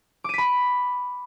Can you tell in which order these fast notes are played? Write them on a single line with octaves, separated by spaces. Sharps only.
D6 D#7 B6 B5